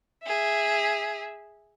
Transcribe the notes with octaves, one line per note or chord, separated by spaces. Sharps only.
G#4 E5